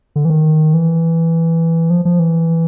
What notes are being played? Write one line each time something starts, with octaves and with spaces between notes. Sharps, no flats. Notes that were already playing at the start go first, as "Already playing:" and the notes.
D3
E3
D#3
E3
F3
F3
E3